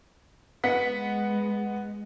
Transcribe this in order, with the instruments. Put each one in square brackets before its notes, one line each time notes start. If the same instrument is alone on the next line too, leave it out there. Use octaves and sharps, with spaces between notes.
[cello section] G#3 [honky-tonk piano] B3 F#5 B6